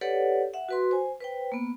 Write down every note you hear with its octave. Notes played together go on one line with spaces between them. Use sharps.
G4 A4 B4 C#5 D5 F#5
E5 F#5
F#4 B4 C6
C5 G#5
B4 C5 G5
A#3 B3